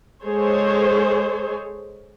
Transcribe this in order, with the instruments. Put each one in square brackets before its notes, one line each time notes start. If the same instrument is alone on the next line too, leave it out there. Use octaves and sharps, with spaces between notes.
[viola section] G#3 G#4 A4 C5 C#5